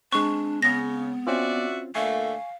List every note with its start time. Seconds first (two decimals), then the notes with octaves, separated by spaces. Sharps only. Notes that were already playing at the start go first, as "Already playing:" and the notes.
0.12 G#3 C4 D4 C#6
0.62 C#3 B3 A#6
1.27 C4 C#4 F4 F#4 D5 E5
1.95 A#2 D3 A3 F5 G#5 C#6